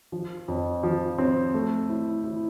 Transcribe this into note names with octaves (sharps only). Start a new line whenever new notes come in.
F3
F2
F3
C4
A3
E4
E4